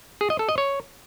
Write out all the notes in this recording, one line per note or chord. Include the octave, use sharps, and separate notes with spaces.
G#4
D#5
A4
D#5
C#5